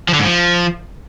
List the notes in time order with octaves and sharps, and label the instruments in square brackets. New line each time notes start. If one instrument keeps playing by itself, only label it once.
[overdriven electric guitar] F3
D3
G#2
F3